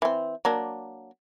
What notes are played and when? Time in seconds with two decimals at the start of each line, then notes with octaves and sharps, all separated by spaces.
0.02 E3 C4
0.45 F#3 A#3 D4